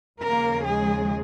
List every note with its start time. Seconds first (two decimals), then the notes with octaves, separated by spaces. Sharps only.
0.20 D#2 C#3 F3 A#3 A#4
0.65 G#3 G#4